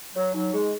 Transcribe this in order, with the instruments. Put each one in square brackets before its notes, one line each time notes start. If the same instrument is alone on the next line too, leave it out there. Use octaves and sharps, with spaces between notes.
[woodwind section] F#3 [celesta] C#5
[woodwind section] F#3 [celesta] D#4
[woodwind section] G#3 [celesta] G#4